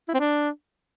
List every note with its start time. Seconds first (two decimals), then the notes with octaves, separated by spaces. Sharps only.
0.08 E4
0.14 C4
0.20 D4